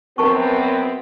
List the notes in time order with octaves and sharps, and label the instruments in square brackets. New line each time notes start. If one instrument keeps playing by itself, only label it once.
[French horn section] F#2 B3 C4 [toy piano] A#4 A5 C#6